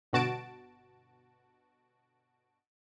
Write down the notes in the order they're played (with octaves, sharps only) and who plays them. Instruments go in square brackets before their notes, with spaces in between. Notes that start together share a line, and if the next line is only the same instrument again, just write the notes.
[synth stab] G1 B2 F#4 A5 D7